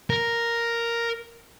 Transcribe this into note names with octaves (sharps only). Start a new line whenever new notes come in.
A#4